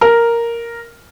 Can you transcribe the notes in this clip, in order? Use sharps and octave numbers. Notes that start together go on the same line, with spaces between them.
A#4